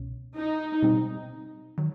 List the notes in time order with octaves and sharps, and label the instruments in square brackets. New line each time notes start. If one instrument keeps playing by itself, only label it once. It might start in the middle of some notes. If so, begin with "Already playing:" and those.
Already playing: [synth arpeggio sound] C2 B2 C#4
[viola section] D#4
[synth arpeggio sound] B2 G3 C4 D#4
D#3 F#3